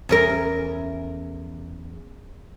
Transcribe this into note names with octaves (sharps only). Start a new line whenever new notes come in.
E2 C#4 A#4